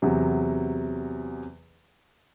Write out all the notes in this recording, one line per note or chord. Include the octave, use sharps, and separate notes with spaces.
E2 C3 F#3